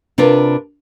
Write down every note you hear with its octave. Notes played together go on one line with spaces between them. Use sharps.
C3 D4 F4 A#4 B4